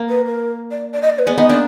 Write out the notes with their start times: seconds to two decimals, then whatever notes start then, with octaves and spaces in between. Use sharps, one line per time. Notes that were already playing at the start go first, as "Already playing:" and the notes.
Already playing: A#3
0.09 B4
0.26 A#4
0.71 D5
0.93 D5
1.02 D#5
1.10 D5
1.19 B4
1.27 G#3 B3 D5
1.38 B3 D#4 D#5
1.49 A#3 D4 D5